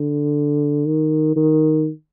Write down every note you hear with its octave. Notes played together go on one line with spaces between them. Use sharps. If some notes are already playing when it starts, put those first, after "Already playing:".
Already playing: D3
D#3
D#3